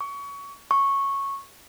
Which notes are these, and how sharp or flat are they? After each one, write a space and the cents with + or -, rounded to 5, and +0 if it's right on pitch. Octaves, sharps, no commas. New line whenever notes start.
C#6 +25
C#6 -10